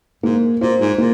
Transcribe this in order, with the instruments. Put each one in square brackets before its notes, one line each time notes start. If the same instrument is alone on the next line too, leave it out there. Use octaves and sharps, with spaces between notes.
[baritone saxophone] G#2 [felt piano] A#3
[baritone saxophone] A#2 [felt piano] F4 C5
[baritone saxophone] G#2
[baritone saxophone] A#2 [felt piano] A#3